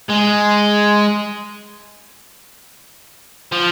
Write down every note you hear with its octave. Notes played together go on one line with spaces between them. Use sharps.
G#3
F3